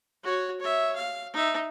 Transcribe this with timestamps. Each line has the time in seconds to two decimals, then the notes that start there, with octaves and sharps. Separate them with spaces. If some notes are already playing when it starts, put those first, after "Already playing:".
0.24 F#4 C#5
0.60 C#5 E5
0.96 F5
1.33 D#4 E5